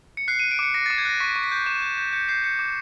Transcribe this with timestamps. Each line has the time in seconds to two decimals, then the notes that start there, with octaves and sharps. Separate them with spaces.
0.17 C#7
0.28 F#6 C7
0.39 F#6 D#7
0.51 D7
0.59 D6 C#7
0.74 D6 A#6
0.86 D6 A6
0.98 G#6
1.05 F#6 A#6
1.20 C#6 B6
1.36 C#6
1.44 B6
1.52 G6
1.66 C#6 E7
1.82 G6
1.98 G6
2.13 G6 C#7
2.29 G6 C7
2.44 G6 C#7
2.59 D6